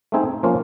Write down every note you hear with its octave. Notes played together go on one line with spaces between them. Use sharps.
A3 C4 D#4 G#4
F3 A#3 C#4 F4